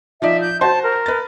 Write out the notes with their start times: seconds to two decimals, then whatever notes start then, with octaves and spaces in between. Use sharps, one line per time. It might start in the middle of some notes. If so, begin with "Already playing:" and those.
0.22 F3 D#4 D5 E5
0.41 G6
0.61 F#4 C5 A5 C6
0.83 A#4
1.06 B4 A6